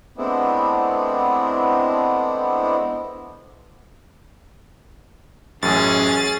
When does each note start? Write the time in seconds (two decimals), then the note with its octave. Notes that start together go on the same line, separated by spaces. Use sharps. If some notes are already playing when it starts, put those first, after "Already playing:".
0.18 G#3 A3 B3 C4 D4 E4
5.63 A1 F#2 C#4 G#4 A6